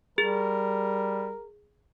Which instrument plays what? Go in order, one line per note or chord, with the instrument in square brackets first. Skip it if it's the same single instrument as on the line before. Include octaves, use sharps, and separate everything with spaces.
[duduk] G3 [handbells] G#4 [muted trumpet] A#4